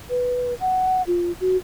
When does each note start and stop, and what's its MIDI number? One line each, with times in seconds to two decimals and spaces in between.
0.10 0.54 71
0.60 1.02 78
1.07 1.32 65
1.41 1.57 66